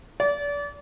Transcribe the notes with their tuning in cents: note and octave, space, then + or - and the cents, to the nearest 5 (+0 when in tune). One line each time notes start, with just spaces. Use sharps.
D5 -30